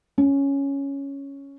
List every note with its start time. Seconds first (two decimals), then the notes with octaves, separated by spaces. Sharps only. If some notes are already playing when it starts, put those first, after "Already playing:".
0.18 C#4